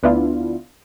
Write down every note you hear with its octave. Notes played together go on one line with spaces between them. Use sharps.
D2 B3 D4 E4 F4